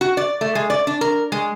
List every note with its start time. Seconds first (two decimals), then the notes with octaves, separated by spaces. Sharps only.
0.01 F#4
0.17 D5
0.41 A3
0.55 G#3
0.70 D5
0.87 D4
1.01 A#4
1.32 G#3